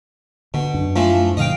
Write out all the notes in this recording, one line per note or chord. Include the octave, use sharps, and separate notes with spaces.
B2 D3
F#2 D4
E3 F3 A3
A#2 D3 F3 D#5 F5 G5